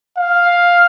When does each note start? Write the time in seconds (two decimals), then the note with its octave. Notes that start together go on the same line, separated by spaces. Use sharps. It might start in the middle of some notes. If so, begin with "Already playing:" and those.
0.18 F5